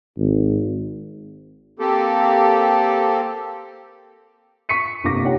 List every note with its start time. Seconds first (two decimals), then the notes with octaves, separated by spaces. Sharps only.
0.18 G#1
1.79 A#3 C4 G4 A4
4.69 C#6 B6 C#7 D#7
5.04 G1 C3 A#3 D6 A#6
5.23 D#4 G4 C#5 F#5